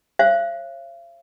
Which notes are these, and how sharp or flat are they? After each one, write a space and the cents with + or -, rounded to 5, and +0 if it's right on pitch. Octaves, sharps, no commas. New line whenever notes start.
C#5 -45 F5 -45